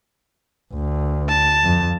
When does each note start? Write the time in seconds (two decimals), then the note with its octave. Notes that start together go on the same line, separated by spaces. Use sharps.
0.74 D2
1.29 A5
1.64 F2